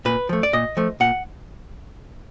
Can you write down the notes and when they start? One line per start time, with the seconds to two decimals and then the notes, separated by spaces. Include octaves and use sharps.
0.05 A#2 B4
0.29 F3 A3
0.43 D5
0.53 A#2 D#5
0.77 F3 A3
1.00 A#2 F#5